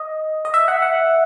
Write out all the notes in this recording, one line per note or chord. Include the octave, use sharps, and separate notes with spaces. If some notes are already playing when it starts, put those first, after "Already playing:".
Already playing: D#5
D#5
E5
F#5
F#5